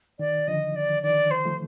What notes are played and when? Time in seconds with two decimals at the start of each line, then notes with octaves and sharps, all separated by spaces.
0.19 D#3 D5
0.48 D3 F3 D#5
0.76 D5
1.03 D#3 D5
1.31 C5
1.45 F3 A3